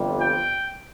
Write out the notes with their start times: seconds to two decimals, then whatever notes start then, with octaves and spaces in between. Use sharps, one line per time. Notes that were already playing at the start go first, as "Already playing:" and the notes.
Already playing: G1 F2 C3 G3
0.21 G5